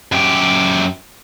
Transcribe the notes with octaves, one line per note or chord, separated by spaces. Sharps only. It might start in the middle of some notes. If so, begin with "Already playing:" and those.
F#2 G4